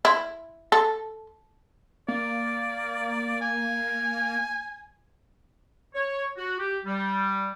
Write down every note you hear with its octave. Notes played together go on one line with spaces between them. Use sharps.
E4
A4
A#3 D5
G#5
C#5
F#4
G4
G3